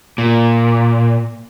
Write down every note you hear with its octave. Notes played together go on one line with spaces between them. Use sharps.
A#2